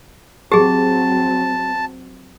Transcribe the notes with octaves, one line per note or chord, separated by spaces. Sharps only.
F#3 C4 G4 G#4 A5